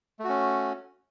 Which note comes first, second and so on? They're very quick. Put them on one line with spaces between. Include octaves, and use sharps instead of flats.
A3 F#4 C#4